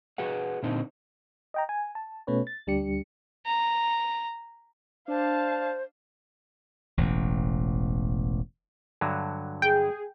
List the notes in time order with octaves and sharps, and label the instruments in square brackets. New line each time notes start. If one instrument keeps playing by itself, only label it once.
[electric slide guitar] F#4 G#4 B4 F#5
A#2 D3 C4 D#4
[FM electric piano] D#5 G5 A#5
G#5
A5
B2 A3 C#4 B4 C#5
A6
D2 G3 D4 G4 C#7
[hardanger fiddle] A#5
[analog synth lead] D4 [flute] C5 [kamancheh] F5 A5
[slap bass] E1 A1
[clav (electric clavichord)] G2 D3 F#3
[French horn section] G#4 [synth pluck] G5